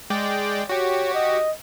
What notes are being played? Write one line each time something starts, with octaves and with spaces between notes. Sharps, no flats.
G#3 D5 G5
F#4 G4 C#5
D#5